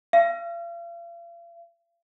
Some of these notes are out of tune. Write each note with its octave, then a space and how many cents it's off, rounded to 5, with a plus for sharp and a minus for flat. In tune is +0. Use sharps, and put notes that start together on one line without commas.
F5 -40